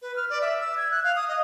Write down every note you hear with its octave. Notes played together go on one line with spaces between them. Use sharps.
B4
F6
D5
E5
E6
G#6
F#6
F5
D#6
D#5